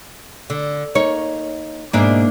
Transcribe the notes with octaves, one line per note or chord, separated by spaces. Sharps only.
D3
A#3 D#4 C#5
G#2 B2 A#3 D4 E4